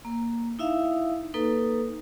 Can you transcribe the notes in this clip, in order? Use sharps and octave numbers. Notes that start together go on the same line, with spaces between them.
A#3
D#4 E4 E5 F5
A#3 D#4 A4 B4